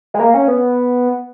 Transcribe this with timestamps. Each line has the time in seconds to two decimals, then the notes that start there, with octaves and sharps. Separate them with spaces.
0.14 G#3
0.19 A#3
0.34 C#4
0.48 B3